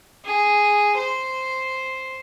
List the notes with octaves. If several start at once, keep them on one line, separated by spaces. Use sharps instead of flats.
G#4
C5